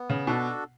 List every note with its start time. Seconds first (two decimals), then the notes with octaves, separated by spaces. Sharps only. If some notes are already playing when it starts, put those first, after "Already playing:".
Already playing: B3
0.10 C#3
0.27 B2 D4 F#4 A4